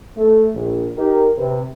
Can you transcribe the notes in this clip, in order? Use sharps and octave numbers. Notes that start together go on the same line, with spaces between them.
A3
A#1
D#4 G4 A#4
C3 B4